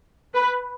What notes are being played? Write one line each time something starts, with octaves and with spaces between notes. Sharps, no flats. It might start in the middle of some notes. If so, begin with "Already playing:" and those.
B4